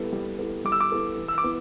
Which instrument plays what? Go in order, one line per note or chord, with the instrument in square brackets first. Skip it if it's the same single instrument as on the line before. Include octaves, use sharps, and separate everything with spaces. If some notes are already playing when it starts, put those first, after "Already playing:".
Already playing: [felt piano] G3 B3 E4 A4
G3
B3 E4 A4
[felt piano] G3 [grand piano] D6
[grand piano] E6
D6
[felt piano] B3 E4 A4
E3
[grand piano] E6
D6
[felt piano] B3 E4